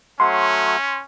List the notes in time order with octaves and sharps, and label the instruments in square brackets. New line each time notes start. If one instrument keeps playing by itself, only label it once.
[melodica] F#3 A3 F#5 [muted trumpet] C#4 [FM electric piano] C6